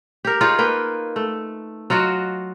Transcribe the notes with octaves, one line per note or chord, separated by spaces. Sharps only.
G4 A#4
D#4 F4 G#4 C#5
A#3 B4 G5
A3
F#3 F4 F#4 D#5